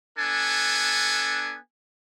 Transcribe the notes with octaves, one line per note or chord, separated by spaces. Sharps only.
B3 D4 A4 G#5